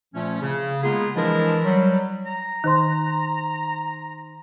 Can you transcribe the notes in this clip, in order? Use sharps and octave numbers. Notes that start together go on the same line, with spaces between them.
A#2 F3 A3 C#4
C#3
G#3 A#3 B3 F4 G#4
E3 F3 G#3 D4 E4 A#4
F#3 G3
A#5
D#3 D#4 C5 C6